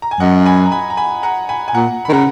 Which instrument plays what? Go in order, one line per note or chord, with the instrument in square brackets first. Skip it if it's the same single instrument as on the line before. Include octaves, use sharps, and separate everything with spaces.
[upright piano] A#5
G#5
[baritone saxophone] F#2 [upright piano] D#5 F#5
[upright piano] G#5 B5
A#5
G#5 B5
A#5
G#5 B5
F#5 A#5
G#5 B5
G#5
[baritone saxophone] A#2 [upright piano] F#5 A#5
[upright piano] B5
[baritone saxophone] D#3
[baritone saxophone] C#3 [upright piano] F#5 A#5